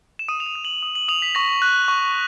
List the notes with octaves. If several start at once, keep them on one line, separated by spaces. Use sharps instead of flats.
E7
D#6 D#7
F7
E7
D#6
F#7
D#6
F#7
D#6 F7
B6
C#6 A#6
F#6
C#6